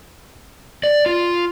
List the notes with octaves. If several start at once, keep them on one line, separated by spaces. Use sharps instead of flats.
D5
F4